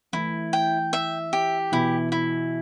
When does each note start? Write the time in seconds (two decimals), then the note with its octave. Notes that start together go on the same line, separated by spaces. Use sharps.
0.13 E3 A3 E4
0.53 G5
0.93 E5
1.33 G4
1.72 B2 E3 E4
2.12 E4